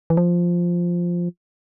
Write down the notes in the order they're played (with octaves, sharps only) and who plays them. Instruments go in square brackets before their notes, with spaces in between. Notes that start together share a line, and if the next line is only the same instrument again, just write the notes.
[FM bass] E3
F3